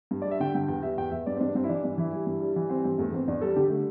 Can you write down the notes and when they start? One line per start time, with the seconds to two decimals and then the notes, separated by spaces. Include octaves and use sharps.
0.11 G2
0.22 D5
0.25 G3
0.31 E5
0.40 D3 G5
0.55 G2 G5
0.68 E2 G5
0.83 G3 E5
0.98 E2 G5
1.12 E2 E5
1.26 G2 D5
1.36 C4
1.40 G2 D4
1.55 G2 C4
1.64 E4
1.69 E3 D4
1.83 G2 D4
1.98 E3 E4
2.13 G3
2.27 G2
2.41 G3
2.56 E3
2.70 G3 C4
2.84 G2 C4
2.98 E2 A3
3.13 E2 C4
3.28 E2 D4
3.41 G3 A4
3.56 D3 G4
3.70 G3 A3